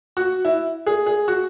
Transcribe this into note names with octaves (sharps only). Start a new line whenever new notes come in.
F#4
E4
G#4
G#4
F#4